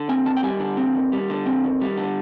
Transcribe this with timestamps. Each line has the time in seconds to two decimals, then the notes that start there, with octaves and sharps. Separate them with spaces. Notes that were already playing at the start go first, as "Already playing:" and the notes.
Already playing: D3
0.09 C4 G#5
0.25 D#2 A5
0.37 G5
0.43 G3 G#5
0.60 D3
0.77 C4
0.95 D#2
1.12 G3
1.30 D3
1.46 C4
1.64 D#2
1.81 G3
1.97 D3